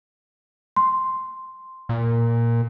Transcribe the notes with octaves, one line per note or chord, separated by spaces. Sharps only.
C6
A#2